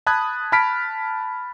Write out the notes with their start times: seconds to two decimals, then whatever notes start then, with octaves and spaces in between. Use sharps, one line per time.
0.07 A5 B5 D#6 F#6 G#6
0.52 A5 B5 F6 B6 D7